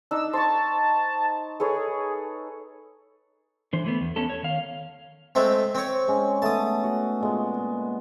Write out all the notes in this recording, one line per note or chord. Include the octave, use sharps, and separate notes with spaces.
D4 D#4 E6
C5 A5 C#6
G#4 A4 B4 C#5
D3 E3 C5
E3 A3 B3
E2
A3 B3 C#4 A4
C#5
D#3 F5
G#3 A3 C4
C4 C#5
G#3 C#4
A3 B3 A5 D#6
F#4
A#2 G#3 B3